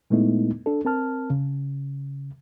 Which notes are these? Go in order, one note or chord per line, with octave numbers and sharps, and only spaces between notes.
A#2 G#3 A3 B3 D#4 E4
D4 A4
C4 A#4 A5 F6
C#3